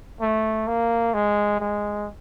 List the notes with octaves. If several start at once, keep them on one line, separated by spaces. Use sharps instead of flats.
A3
A#3
G#3
G#3